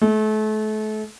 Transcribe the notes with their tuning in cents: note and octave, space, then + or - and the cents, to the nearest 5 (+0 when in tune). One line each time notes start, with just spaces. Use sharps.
A3 -35